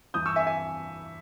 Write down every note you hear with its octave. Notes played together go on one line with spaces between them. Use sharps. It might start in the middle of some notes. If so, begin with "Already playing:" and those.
G2 E3 D#6 G6
C#6 E6
E5 G#5
E5 G#5